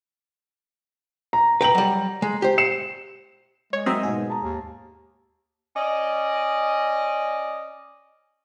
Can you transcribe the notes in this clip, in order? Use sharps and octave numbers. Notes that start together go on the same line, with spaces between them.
A#5
B4 G5 A#5 F#7
F#3 G3
G#3
G4 C5
C7 C#7 E7
G#3 C#5
F#3 C4 A#4 D#5 E5
G#2 B2 G#4
A5 A#5
D#2
C#4 D5 D#5